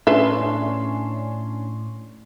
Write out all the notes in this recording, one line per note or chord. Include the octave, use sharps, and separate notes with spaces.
A2 C#4 D4 B4 E5 C6